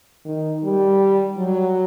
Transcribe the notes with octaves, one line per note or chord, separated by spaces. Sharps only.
D#3
G3
F#3